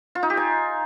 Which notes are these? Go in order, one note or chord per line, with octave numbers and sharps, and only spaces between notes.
F4
D#4
G4
G#5